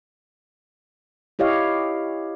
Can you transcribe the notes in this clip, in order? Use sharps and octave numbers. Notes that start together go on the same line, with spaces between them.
E4 G4 C#5 D#5 F5